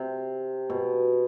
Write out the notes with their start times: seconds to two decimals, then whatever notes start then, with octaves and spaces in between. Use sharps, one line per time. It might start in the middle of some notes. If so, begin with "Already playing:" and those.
Already playing: C3
0.70 B2